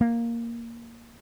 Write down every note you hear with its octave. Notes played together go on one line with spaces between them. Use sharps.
A#3